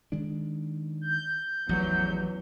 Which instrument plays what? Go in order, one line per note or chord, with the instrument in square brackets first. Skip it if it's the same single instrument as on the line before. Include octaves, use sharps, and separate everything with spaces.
[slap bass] D#3 G#3 D4
[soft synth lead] G6
[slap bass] A1 F3 [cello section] E2 F#3